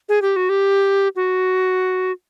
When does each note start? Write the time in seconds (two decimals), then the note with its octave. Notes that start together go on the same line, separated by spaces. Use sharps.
0.09 G#4
0.22 G4
0.36 F#4
0.49 G4
1.16 F#4